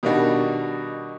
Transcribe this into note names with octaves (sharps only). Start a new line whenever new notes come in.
B2 D#3 G3 D4 D#4 F#4